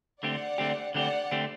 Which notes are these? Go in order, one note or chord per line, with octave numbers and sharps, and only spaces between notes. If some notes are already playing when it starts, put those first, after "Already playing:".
D3 A3 C4 G4 D5 F#5
D3 A3 C4 G4
D3 A3 C4 G4 D5 F#5
D3 A3 C4 G4